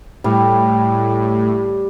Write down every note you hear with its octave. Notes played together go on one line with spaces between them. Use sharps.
A2 G3